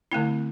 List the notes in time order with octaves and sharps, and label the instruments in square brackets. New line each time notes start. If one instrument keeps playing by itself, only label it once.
[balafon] D3 A3 C4 E4